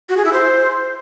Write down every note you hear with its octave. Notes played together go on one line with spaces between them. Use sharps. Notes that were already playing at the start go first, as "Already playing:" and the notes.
F#4
G#4
E4
C5